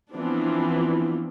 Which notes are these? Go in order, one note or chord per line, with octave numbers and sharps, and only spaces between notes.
E3 F3 B3 C4 D4